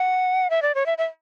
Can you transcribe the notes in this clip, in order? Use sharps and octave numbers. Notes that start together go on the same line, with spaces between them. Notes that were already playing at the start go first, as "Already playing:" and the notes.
Already playing: F#5
E5
D5
C#5
E5
E5